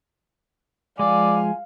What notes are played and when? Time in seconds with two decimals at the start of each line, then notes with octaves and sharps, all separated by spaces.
0.99 F3 G#3 D5 F5 G#5